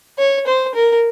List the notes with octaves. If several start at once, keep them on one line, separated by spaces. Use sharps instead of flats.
C#5
C5
A#4